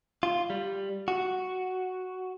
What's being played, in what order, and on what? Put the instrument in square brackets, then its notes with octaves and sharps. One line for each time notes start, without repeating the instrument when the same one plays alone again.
[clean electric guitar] F4
G3
F#4